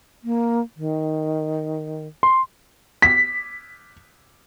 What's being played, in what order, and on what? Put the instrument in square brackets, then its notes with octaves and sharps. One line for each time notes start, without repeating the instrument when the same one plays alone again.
[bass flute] A#3
D#3
[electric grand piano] C6
[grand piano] B6